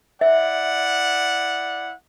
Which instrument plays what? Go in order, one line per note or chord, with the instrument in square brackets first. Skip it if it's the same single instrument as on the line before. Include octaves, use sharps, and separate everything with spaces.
[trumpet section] E4 D5 F#5 [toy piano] E5